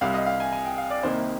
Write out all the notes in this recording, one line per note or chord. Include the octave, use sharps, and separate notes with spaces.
C2 C3 G3 F5
D#5
F5
G#5
G#5
G5
F5
D5
C2 C3 D#3 A#3 D#4 C5